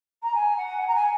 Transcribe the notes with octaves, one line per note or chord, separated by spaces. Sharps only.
A#5
G#5
F#5
G#5
A#5
G#5